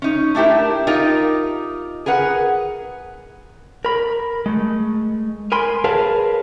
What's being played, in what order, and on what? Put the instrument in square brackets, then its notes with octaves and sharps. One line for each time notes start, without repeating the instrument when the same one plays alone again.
[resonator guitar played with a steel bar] C#4 D#4
A3 D4 E4 G4 A#4
D#4 F4 G4 A#4 D#5
G#4 A#4 B4 F#5
[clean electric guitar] A#4 B5
G#3 A3
A#4 G#5 B5 C6
G#4 A#4 B4 C#5 F5 A5